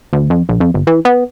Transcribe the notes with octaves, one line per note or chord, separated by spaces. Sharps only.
D2
F2
A#1
F2
G1
E3
B3